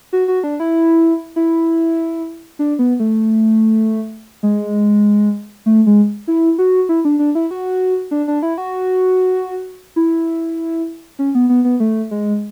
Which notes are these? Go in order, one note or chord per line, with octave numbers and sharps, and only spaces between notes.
F#4
F#4
D4
E4
E4
D4
B3
A3
G#3
A3
G#3
E4
F#4
E4
D4
D4
E4
F#4
D4
D4
E4
F#4
E4
C#4
B3
B3
B3
A3
G#3